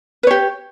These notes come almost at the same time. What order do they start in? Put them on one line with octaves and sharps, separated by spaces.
B4 C#5 G4